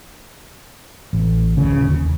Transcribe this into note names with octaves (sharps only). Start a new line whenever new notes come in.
A1
D1 C#3
D#2